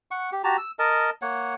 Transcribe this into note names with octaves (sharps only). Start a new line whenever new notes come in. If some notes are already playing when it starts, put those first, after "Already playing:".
F#5 C#6
G4
F#4 G4 A5 A#5
E6
A#4 D#5 A5
A#3 C#5 F#5